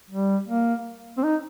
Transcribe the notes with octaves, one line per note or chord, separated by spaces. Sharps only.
G3
A#3
C4
D#4